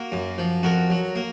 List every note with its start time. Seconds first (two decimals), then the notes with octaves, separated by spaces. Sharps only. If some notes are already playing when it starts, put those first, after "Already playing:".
Already playing: A#3 F#4 A#4
0.12 F#2
0.38 F3
0.63 F2 F#4 A#4
0.90 F#3
1.16 A#3